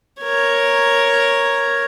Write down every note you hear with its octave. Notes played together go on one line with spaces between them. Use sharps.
A#4 C#5